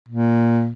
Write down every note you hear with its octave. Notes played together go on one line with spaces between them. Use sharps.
A#2